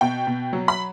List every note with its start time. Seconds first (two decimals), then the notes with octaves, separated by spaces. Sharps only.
0.01 B2 G5
0.27 B2
0.53 F#3
0.68 B5